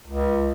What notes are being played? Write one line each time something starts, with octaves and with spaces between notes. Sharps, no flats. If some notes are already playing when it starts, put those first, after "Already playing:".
C#2